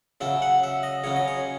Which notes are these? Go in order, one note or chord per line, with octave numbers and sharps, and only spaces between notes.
C#3 F#3 C#4 E5
F#5
E5
D#5
C#3 F#3 C#4 C#5
D#5
C#5